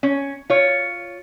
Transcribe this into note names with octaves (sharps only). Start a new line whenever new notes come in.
C#4
F4 C#5